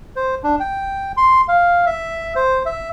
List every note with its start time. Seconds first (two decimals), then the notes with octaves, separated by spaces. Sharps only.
0.16 C5
0.44 D4
0.60 G5
1.17 C6
1.48 F5
1.86 E5
2.36 C5
2.66 E5